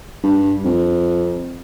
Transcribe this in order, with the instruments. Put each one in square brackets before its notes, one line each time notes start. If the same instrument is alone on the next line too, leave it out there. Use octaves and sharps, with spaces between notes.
[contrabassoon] G2
F2